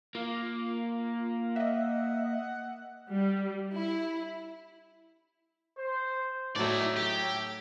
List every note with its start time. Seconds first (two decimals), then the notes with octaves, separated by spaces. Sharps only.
0.15 A#3 F4
1.56 D#5 E5 F#5
3.11 G3
3.74 E4
5.78 C5
6.56 A2 F#3 A3 D#4 E4 C#5 D5 E5
6.97 G4